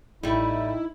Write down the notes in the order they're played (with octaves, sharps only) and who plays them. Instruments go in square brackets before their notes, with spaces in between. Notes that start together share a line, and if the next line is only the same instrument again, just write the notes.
[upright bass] A1 [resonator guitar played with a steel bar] G3 A3 [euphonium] D#4 [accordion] E4